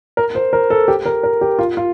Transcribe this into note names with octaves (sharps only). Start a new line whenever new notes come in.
A#4
C5
A#4
A4
G4
A#4
A#4
G4
F4
F4